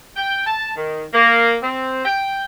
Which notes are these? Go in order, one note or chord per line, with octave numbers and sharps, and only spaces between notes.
G5
A5
D#3
A#3
C4
G5